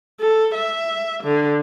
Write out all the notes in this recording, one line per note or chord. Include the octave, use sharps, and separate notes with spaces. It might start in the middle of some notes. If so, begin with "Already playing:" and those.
A4
E5
D3